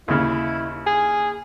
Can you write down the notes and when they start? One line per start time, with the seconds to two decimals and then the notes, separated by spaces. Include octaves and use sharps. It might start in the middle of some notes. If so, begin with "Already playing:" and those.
0.08 D#2 C#3 E4
0.87 G#4